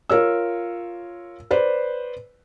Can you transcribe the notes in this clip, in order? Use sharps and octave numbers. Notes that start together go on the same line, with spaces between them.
F4 A#4 C#5 E6
B4 C5 D5